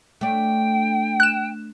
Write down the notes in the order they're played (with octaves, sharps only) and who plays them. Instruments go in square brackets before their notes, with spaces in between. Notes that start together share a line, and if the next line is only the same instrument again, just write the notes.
[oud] A3 D4 [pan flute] G5
[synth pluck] F#6 E7